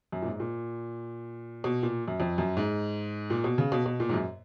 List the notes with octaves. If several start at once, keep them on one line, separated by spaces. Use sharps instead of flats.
F#2
A#2
G#2
A#2
B2
A#2
F#2
F2
F#2
G#2
A#2
B2
C#3
B2
B2
A#2
G#2
F#2